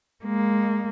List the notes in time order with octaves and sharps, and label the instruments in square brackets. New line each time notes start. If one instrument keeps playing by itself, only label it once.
[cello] G#3 A#3